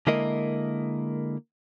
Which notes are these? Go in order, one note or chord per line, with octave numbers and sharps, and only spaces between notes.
D3 G#3 A#3 E4 A#4 D#5